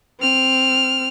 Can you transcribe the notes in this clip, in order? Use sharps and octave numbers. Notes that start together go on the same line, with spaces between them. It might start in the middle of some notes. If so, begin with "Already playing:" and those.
C4 F6